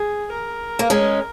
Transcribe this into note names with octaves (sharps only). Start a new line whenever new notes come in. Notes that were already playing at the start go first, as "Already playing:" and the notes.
Already playing: G#4
A#4
A#3
G#3 C#4